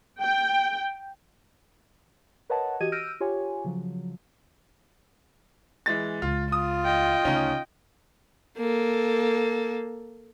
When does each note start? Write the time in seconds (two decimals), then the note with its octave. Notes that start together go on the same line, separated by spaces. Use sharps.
0.21 G5
2.50 A#4 B4 C#5 D#5 F#5 A5
2.80 E3 F#4 G4 D#5 G#6 D#7
2.92 E6 F6 G6 A#6 D7 D#7
3.20 F4 G4 C#5 G#5
3.64 C#3 F3 F#3
5.86 E3 G#3 A6
6.22 C#2 F4
6.52 F4 D#6
6.85 D#5 G5
7.25 D2 C#3 C#4 D#4
8.58 A#3 A4